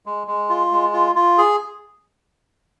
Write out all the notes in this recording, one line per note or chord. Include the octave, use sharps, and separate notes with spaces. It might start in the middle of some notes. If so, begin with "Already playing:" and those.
G#3
G#3
F4
G#3
F4
F4
G#4